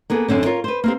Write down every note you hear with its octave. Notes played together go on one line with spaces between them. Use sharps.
A#3 B3 G#4 A4
F#2 D3 C4 C#4
F4 A#4 C#5
B4 C5
A#3 C4 G4